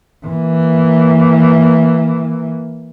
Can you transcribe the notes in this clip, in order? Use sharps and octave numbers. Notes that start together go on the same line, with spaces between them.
E3 A#3